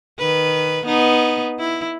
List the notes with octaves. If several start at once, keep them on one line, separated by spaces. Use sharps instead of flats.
D#3 B4
B3 D#4
E4